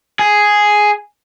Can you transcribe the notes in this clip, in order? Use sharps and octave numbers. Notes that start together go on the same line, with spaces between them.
G#4